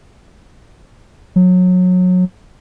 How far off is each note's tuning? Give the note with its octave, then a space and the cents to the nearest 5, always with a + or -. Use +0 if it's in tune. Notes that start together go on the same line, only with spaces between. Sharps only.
F#3 -25